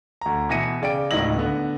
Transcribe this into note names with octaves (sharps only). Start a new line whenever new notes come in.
D2 A#5
B2 E3 E5 A#6 C#7 D#7
C#3 D5 G5 D7
D1 C#2 D#4 E4 A#6 F#7
D3 B3